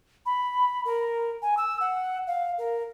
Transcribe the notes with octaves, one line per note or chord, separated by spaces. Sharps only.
B5
A#4
G#5
E6
F#5
F5
A#4